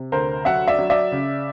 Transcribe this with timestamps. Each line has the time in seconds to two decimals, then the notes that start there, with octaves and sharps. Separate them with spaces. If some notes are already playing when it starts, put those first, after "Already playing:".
Already playing: C3
0.12 D2 A#4 C5
0.45 F#3 E5 F#5
0.68 D5 E5
0.79 F#3
0.90 D5 E5
1.12 C#3